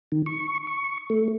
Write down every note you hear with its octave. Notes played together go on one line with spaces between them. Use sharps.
D#3
C#6
C#6
A3